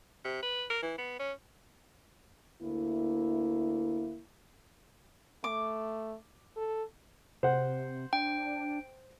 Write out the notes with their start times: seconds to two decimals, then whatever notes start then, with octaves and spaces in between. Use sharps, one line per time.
0.24 C3
0.42 B4
0.70 A#4
0.82 E3
0.98 B3
1.19 C#4
2.61 D2 A#3 E4
5.44 A3 D6
6.56 A4
7.43 C3 C5 F#5
8.13 D4 G5